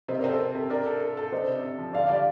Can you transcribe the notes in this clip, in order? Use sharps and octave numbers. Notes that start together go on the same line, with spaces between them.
C3 C5 D#5
A#4 D5
C4
A4 C5
C4 A#4
C3 A4
D4 A#4
A4
A4
A4
D4 C5 D#5
C3
C3
F3
D3 D5 F5
G3 D5 F5